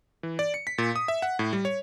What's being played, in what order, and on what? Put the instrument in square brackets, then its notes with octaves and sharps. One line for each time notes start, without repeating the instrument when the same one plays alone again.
[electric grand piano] E3
D5
C#7
B6
A#2
D#6
E5
F#5
A2
G3
C#5